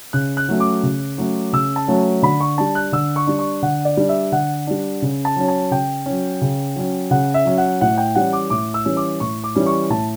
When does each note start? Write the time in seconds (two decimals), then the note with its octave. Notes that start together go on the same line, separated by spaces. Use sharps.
0.13 C#3 F#6
0.37 F#6
0.49 F#3 A3 C#4
0.60 D6
0.83 C#3
1.18 F#3 A3 C#4
1.53 C#3 E6
1.76 A5
1.88 F#3 A3 C#4
2.23 D3 B5
2.41 C#6
2.58 G3 D4 A5
2.75 F#6
2.92 D3 E6
3.16 C#6
3.27 G3 D4
3.39 C#6
3.62 D3 F#5
3.85 D5
3.97 G3 D4
4.09 E5
4.32 D3 F#5
4.67 G3 D4
5.02 C#3
5.25 A5
5.36 F#3 C#4
5.48 A5
5.71 C#3 G5
6.06 F#3 C#4
6.42 C#3
6.76 F#3 C#4
7.11 C#3 F#5
7.34 E5
7.45 F#3 C#4
7.58 F#5
7.81 A2 F#5
7.98 G5
8.15 E3 G3 C#4 F#5
8.33 D6
8.50 A2 D6
8.74 E6
8.85 E3 G3 C#4
8.97 D6
9.20 A2 C#6
9.44 D6
9.55 E3 G3 C#4
9.66 C#6
9.90 A2 A5